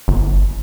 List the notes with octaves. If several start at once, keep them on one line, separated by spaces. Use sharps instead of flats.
G1